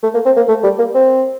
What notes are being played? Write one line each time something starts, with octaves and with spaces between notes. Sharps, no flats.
A3
A#3
C4
A#3
A3
G3
A#3
C4